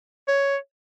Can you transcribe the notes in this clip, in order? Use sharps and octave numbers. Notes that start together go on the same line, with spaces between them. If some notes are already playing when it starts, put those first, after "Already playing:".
C#5